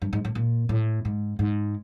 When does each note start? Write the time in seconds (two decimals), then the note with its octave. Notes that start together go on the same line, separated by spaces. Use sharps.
0.02 G2
0.13 G#2
0.25 A2
0.35 A#2
0.69 A2
1.05 G#2
1.39 G#2